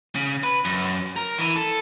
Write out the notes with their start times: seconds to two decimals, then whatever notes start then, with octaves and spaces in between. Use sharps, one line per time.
0.15 C#3
0.43 B4
0.65 F#2
1.16 A#4
1.38 E3
1.56 A4